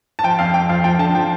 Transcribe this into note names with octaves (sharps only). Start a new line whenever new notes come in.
A5
F3 G5
F2 F5
F2 G5
F3 F5
F3 G5
D3 A5
F3 G5